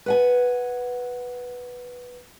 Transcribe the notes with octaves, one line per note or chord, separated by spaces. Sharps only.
B4 F#5 G#5